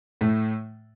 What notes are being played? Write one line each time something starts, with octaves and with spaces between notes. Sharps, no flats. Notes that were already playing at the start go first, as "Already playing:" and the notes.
A2 A3